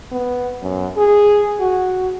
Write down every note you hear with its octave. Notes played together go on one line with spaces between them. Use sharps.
B3
F#2
G#4
F#4